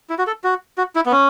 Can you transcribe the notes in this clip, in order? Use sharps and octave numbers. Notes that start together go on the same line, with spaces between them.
E4
F#4
A4
F#4
F#4
E4
B3
C#4